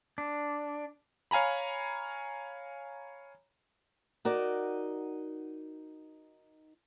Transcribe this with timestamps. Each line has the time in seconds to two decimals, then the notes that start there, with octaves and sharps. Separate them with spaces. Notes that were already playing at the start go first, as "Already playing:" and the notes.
0.18 D4
1.31 C#5 F5 G#5 A#5 B5
4.25 D#4 F#4 A#4 D5